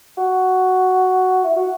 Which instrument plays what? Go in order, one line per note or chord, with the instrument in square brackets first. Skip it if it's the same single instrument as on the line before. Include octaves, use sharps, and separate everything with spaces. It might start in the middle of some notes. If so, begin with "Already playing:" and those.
[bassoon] F#4
E4
F#4